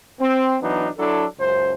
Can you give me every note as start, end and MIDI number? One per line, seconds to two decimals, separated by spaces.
0.19 0.56 60
0.60 0.86 52
0.60 0.86 54
0.60 0.86 59
0.60 0.86 62
0.60 0.86 63
0.97 1.24 54
0.97 1.24 62
0.97 1.24 64
0.97 1.24 69
1.38 1.72 37
1.38 1.72 42
1.38 1.72 72